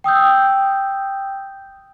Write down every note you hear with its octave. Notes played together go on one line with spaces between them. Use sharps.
G5 D#6 E6 G6